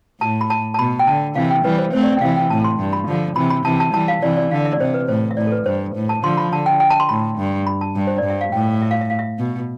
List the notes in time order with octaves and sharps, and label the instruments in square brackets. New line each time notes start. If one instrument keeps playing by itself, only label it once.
[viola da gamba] A2 [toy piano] A5
[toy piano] B5
A5
A5
[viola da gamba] B2 [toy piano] B5
[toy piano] G5
[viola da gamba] D3 [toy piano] A5
[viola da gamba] C3 E3 [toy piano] F5
[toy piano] G5
[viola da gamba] E3 G3 [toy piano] B4
[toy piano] C5
[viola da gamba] A3 C4 [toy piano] C5
[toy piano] D5
E5
G5
[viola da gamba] C3 E3 [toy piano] F5
[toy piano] G5
[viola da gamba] A2 [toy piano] A5
[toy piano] C6
[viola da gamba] G2
[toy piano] B5
[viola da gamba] D3 F3
[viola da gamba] C3 E3 [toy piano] B5
[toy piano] B5
[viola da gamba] C3 E3 [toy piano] A5
[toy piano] A5
[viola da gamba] E3 G3 [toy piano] A5
[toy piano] F5
[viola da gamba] C3 E3 [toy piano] D5
[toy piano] D5
[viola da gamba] D3 [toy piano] F5
[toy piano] E5
D5
[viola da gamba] C3 [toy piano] C5
[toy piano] B4
[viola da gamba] A2 [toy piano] C5
[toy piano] E5
[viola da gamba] A2 [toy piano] D5
[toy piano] A4
B4
[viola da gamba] G2 [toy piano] C5
[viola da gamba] A2
[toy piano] A5
[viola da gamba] D3 F3 [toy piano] C6
[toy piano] B5
[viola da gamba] D3 [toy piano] A5
[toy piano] G5
G5
A5
C6
[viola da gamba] A2 [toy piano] B5
[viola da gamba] G2
[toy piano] B5
A5
[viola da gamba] G2
[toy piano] C5
D5
[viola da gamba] G2
[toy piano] E5
F5
[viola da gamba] A2 [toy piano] G5
[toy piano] E5
F5
E5
F5
E5
[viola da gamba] B2